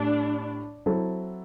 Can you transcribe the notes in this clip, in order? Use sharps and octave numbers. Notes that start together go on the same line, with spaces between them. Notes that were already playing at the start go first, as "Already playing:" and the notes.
Already playing: A2 G3 D4
F#3 C4 E4 A4